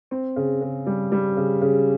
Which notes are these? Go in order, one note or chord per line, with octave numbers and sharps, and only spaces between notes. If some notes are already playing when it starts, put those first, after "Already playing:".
C4
C#3
C#3
G3
G3
C#3
C#3